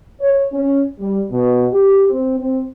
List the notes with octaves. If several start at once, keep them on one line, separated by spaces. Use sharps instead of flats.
C#5
C#4
G3
B2
G4
C4
C4